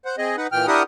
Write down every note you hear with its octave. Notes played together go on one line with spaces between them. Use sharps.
C5 F#5
C4 G#4 D#5
D#4 B4 F#5
A#2 E3 G5 F6
D4 E4 G4 A#4 F#5 D#6